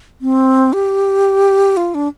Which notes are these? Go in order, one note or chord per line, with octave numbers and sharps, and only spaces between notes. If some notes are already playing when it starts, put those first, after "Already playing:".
C4
G4
F4
D4